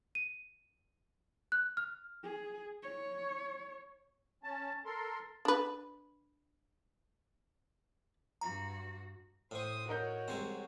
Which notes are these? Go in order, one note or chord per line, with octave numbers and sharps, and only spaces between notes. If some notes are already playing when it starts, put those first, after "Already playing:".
D#7
F#6
F6
G#4
C#5
C#4 A5
A4 A#4 C6
D4 B4
G2 F#4 A#5
A2 C5 C#6 D#6
F#4 A#4 C#5 D#5 G6
C2 G#3 C4 C5